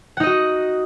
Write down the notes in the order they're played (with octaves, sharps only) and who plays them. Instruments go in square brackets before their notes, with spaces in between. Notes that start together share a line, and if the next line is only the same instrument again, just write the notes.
[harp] F#5
D#4
D#5
F#4